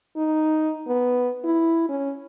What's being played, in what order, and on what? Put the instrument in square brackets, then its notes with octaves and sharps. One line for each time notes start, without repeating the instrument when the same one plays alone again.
[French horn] D#4
B3
E4
C#4